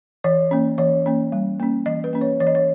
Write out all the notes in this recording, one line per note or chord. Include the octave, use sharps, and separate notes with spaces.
E3 C#5
A#3 C#4
E3 C#5
A#3 C#4
G3
A#3 C#4
E3 D#5
B4
A#3 C#4
C#5
E3 C#5
D#5
C#5